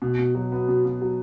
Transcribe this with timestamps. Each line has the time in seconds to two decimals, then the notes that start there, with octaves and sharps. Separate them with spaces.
0.02 B2
0.19 B2
0.35 F#3
0.52 B3
0.68 B2
0.85 B2
1.01 F#3